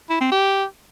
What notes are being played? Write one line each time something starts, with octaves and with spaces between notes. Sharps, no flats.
E4
C4
G4